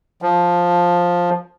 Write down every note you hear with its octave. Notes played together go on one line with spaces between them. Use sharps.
F3